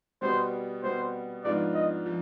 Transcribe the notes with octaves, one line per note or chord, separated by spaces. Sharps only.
B2 G3 B3 C5
B2 G3 B3 C5
G#2 F3 B3 D4 F4 D5
D#5
F3